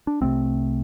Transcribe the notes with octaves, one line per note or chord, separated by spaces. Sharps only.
D4
C2 C3 A3 C4